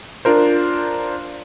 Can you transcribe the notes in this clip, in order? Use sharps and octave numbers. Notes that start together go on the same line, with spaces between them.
D4 F4 A#4 C5